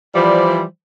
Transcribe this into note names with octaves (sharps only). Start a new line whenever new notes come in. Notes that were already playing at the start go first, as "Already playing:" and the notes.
E3 F3 G3 C5 D5